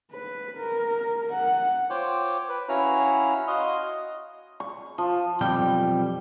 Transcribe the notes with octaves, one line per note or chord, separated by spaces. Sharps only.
B4
A#4
F#5
F4 C5 C#5 G5 D6
B4
C#4 E4 F#4 C#5 F5 A#5
F#4 D#5 F5 C6 D#6
D#5
C#6
F3
B1 F2 G3 G5